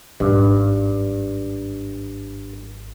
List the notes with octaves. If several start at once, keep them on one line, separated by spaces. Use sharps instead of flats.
G#1 G2